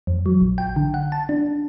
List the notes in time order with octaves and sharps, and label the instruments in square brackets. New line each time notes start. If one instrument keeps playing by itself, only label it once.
[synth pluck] F2
F#3
A#1
G5
D3
F#5
A5
D4